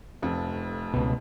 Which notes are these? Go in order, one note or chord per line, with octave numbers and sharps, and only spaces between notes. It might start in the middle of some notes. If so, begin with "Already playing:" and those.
F1 F2
C#2 B2